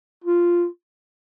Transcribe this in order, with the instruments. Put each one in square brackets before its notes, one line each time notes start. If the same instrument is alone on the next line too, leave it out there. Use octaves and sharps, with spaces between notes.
[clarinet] F4